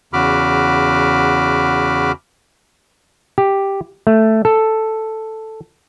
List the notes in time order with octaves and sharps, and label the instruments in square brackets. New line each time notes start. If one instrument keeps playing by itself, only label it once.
[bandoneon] E2 C#3 F#4 B5 D6 F6
[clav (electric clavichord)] G4
A3
A4